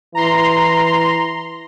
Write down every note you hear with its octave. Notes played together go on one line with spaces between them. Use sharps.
E3 A#5 C6